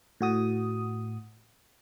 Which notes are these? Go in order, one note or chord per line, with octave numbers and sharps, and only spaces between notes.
A2 F#4 D#6